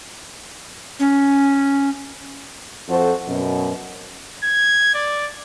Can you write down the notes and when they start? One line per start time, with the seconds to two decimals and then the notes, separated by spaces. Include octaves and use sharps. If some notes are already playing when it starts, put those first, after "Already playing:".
0.99 C#4
2.88 F2 F#4 A4 C5
3.27 F#2 B2
4.43 G#6
4.94 D5